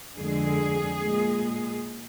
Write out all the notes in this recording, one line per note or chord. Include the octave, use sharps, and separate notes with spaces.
F2 D3 G#3 G#4
A#2 G#3